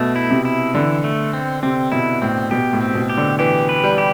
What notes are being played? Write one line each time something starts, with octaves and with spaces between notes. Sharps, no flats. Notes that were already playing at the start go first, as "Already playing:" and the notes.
Already playing: B2 A3
E4
C3
E4
D3 E3
A3
C4
C3 C4
B2 E4
A2 C4
B2 G4
A2
C4
B2
G4
D3
E3 G4
B4
G3
G4